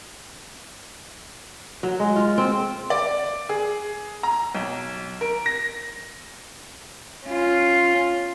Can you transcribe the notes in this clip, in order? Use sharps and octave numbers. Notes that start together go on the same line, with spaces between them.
F#3
G#3
F4
C4
D5
G#4
A#5
B1
A#4
A#6
C#4 F4